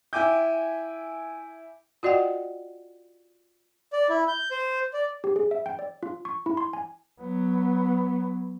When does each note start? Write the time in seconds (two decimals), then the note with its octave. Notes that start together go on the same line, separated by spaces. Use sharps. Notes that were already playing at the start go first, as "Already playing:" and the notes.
0.13 E4 E5 G5 G#5 D6 G6
2.03 F4 F#4 D5 D#5 F#5 G5
3.93 D5
4.10 E4
4.28 G6
4.51 C5
4.94 D5
5.24 G4
5.36 G#4
5.51 E5
5.66 G5
5.79 D5
6.03 F4
6.25 C#6
6.46 E4
6.57 C6
6.73 G#5
7.21 F#3 B3